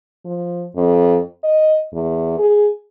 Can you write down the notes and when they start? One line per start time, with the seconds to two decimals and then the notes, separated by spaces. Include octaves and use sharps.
0.25 F3
0.76 F2
1.44 D#5
1.93 E2
2.38 G#4